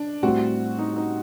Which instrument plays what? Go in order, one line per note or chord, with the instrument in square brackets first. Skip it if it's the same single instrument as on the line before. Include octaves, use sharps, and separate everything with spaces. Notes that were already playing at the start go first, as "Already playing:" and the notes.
Already playing: [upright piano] D4
[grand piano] A2 G3 C4 [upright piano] F#4
[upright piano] D#4
D#4